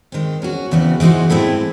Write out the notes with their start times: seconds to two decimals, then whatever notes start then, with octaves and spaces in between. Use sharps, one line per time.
0.12 D#3 G#3 C4
0.42 F#3 C#4 F#4
0.71 E2 C#3 E3 C4 F#4
1.00 E3 G#3 D#4 F#4 C5
1.30 A2 G#3 C4 E4 A4